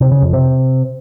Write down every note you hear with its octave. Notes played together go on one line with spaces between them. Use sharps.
C3
C#3
F2
C3